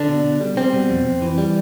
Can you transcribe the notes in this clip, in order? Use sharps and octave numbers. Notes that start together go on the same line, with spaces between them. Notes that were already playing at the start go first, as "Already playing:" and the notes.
Already playing: D3 D4
B2
B2
G3
G3 C4
B2
F2
F2
E3
G3